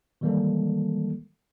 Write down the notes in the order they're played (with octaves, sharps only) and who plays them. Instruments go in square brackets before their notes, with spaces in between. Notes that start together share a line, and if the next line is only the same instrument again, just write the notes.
[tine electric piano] D#3 E3 G3 G#3 A#3 A4